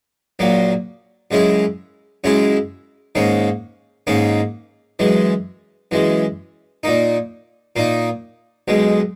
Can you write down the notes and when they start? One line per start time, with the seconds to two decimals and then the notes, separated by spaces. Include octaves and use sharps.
0.39 A#1 A#2 F#3 A#3
1.31 F#2 C#3 G#3 C#4 E4
2.24 F#2 C#3 G#3 C#4 E4
3.15 G#2 D#3 A#3 C#4
4.07 G#2 D#3 A#3 C#4
4.99 F#2 E3 G#3
5.91 F#2 E3 G#3
6.83 A#2 A#3 D#4
7.76 A#2 A#3 D#4
8.68 B1 B2 G#3